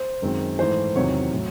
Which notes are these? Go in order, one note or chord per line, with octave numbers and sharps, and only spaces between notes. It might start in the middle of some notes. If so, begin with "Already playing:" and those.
Already playing: C5
F#2 D#3 G#3 C4
G#2 E3 A3 C5
E2 C3 D#3 F#3 C4 C#5
A2 F#3